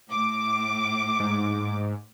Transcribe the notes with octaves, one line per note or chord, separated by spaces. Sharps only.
A2 D6
G#2